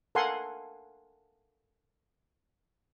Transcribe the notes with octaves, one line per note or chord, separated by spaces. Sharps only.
A4 A#4 F5 F#5 G#5 C6